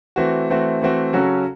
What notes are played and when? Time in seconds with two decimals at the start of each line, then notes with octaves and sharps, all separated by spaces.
0.16 E3 A3 C4 F#4
0.50 E3 A3 C4 F#4
0.82 E3 A3 C4 F#4
1.13 C#3 F#3 C#4 F#4 A4